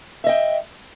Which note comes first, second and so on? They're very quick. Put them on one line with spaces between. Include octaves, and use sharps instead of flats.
E5 D#5 G5